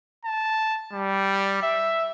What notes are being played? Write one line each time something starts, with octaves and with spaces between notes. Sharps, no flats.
A5
G3
E5